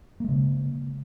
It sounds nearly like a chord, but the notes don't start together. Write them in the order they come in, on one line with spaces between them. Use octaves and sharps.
A#3 G#3 C#3